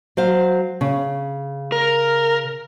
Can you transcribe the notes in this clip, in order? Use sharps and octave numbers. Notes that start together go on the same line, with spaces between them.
F#3 C5 F5
C#3
A#4